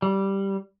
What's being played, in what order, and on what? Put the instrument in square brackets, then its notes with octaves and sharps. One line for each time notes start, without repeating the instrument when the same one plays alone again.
[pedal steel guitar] G3